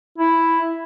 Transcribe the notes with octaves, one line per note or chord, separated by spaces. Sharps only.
E4